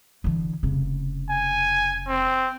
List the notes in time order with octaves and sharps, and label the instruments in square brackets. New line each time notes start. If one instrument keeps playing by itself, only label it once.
[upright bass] D3 E3
F1 C#3
[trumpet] G#5
C4